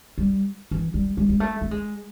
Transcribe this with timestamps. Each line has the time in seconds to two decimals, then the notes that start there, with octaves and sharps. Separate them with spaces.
0.18 G3
0.71 E3
0.94 G3
1.17 G#3
1.29 G#3
1.40 A3
1.61 A3
1.71 G#3